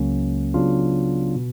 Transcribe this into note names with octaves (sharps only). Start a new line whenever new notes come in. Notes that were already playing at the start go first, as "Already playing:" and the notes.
Already playing: C#2 C#3 F#3 A#3 C#4
C#3 F#3 B3 D4 F4
B2